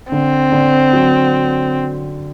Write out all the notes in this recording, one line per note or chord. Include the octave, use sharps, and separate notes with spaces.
D3 C4
D3
F#3